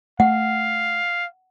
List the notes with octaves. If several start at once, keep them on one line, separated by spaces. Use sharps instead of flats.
A3 F5 F#5